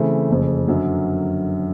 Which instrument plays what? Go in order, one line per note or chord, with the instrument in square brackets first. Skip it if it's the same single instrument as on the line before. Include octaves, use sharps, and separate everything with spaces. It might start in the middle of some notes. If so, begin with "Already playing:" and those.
Already playing: [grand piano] C#3 E3 A3 C4
F#1 F2 C#3
F#2 D3 F#3